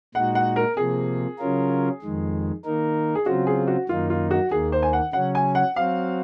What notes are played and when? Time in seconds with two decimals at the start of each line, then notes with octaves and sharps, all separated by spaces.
0.14 A#2 G#3 D#4 F#4 F#5
0.35 F#5
0.56 A#4
0.76 C3 F3 A#3 G#4
1.39 C#3 F#3 C#4 F4 A#4
2.02 F2 D#3 G#3
2.65 D#3 A#3 D#4 A#4
3.15 G#4
3.26 C#3 F#3 C4 F4 F#4
3.47 G#4
3.67 F#4
3.89 F#2 D#3 A#3 D#4 F4
4.10 F4
4.31 F#4
4.51 D#2 D#3 A#3 G#4
4.72 C5
4.83 G#5
4.93 F#5
5.13 C#3 F#3 C#4 F#5
5.35 G#5
5.55 F#5
5.76 F#3 C4 F#4 F5